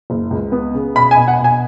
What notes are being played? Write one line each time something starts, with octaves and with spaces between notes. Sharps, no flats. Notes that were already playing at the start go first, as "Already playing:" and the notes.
F#1
C#2
B3
C#3
B2 B5
G#5
B2
F#5
B2
G#5